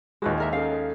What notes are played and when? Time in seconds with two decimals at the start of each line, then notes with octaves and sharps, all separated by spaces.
0.22 D#2 G#3 F#4 B4 D#5
0.38 E4 A#4 D#5 E5
0.53 C#4 A4 F5